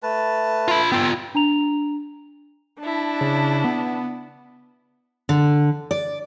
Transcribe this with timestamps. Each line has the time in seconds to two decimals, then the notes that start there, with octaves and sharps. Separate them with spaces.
0.03 A3 B4 A5
0.68 F4 B5
0.92 B3 F4 G5 E6
1.35 D4 A#5 F7
2.81 D4 E4 A5
3.21 C#3
3.64 B3
5.29 D3
5.91 D5